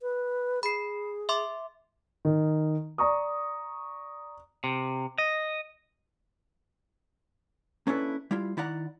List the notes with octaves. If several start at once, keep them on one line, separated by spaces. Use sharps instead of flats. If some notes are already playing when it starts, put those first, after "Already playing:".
B4
G#4 B5 C7
E5 C6 D6
D#3
D5 A#5 C#6 D#6
C3
D#5
A#3 C#4 D4 E4 A4 B4
G3 E4 F4
D#3 E4 D5 F#5 A#5